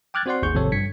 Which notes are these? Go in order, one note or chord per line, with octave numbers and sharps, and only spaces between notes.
G5 D6 F6 F#6 G#6 A6
C4 F#4 C5 D5 F#5 C6
G#1 D#2 D#4 G#4 C#6 G6
G#1 C3 F3 C4 A4 C#5
G2 G#6 B6 C#7